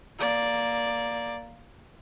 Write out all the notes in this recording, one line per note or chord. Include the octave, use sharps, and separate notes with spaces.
A#3 D5